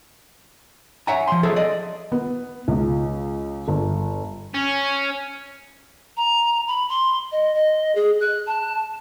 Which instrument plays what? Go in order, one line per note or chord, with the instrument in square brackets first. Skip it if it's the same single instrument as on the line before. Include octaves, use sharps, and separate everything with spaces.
[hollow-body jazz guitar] C#5 E5 F#5 G#5 A#5
F3 C6
G#4 A4 C#5 E5
D5 D#5
[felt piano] B3
C#2
G1
[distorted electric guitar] C#4
[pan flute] A#5
B5
C6
D#5
D#5
G#4
F#6
A5